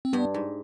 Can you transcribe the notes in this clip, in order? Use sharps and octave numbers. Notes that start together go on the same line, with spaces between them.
C4
G2 B3
G#2